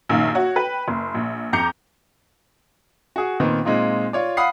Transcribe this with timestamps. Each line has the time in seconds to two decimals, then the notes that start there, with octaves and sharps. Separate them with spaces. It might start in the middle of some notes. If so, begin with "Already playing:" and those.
0.09 A#1 F#2 D#3 F5
0.35 F#4 C#5
0.56 B4 G5
0.88 F#1
1.14 A#1
1.53 F2 A#5 D6 G6 C#7
3.16 F#4 G#4
3.40 A#2 D#3 B3 C4
3.65 A#2 G#3 C4 D#4 F4
4.13 F4 C#5 D5
4.37 F5 F#5 B5 D#6 C7